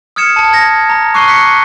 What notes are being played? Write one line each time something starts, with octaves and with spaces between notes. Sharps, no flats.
D#6 F6 G#6 C#7 E7
A5
G#6 A#6
A#5
C#6 D6 F#6 C7 D#7 G7
F#6 B6 C#7